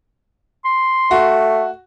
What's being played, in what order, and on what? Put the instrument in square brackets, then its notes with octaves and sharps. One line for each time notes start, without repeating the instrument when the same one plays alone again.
[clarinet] C6
[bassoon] A3 [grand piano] F#4